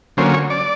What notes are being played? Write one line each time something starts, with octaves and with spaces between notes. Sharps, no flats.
D3 F#3 A#3 C#4 C5
C#5
D5